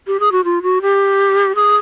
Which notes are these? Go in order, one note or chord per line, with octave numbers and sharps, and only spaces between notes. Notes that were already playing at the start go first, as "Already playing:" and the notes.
G4
G#4
F#4
F4
F#4
G4
G#4